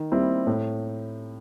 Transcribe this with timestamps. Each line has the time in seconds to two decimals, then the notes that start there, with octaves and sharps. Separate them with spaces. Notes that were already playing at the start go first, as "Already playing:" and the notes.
Already playing: D#3
0.12 G3 C4 E4
0.47 A2